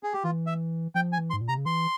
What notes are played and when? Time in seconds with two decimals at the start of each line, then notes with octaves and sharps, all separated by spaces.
0.03 G#4
0.13 G4
0.24 E3 F4
0.47 E5
0.94 F3 G5
1.13 G#5
1.18 E3
1.30 C6
1.33 G#2
1.41 A#2
1.48 C3 A#5
1.58 C#3
1.66 E3 C6